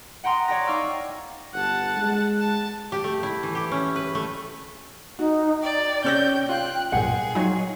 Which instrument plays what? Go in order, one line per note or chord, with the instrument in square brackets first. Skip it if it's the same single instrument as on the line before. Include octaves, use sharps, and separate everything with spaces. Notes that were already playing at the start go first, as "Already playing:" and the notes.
[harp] F#5 G5 A#5 C6 D#6
C#5 D5 G5 A#6
D#4 F5 C#6 D6 E6
[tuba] G1 [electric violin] F#5 A5
[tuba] G#3
[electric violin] A5
[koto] G4
A3
E4
E3
G4
C#4
B4
A3
[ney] D#4 [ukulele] F#4
[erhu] D5 [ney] G5
[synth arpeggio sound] C3 E6 A#6 [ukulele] C#4 C#5 D5 [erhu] G6
[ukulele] F4 F5 [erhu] F#6
[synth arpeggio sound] B1 G2 A#2 [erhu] G#4 [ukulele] F#5
[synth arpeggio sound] F#3 D#4 [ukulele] F4 C#5